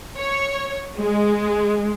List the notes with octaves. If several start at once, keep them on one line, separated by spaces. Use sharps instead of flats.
C#5
G#3